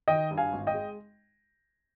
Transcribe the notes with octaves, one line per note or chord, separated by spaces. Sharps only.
D#3 D#5 G5
G2
F5 G#5
G#1
D#5 G5
G#3